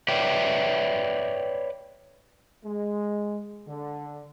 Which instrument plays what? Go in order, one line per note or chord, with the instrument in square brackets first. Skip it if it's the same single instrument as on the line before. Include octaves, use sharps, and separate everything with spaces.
[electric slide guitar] B4 C#5 D5 E5 G5
[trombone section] G#3
D3